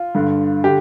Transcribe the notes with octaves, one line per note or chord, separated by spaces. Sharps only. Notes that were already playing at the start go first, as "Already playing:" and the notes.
Already playing: F4
G2 D3
D3 G4